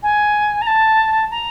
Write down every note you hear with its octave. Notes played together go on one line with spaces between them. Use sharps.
G#5
A#5
A5
A#5